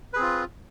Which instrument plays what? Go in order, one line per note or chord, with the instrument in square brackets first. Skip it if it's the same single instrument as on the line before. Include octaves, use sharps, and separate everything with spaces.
[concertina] B4
G#4
C4
F4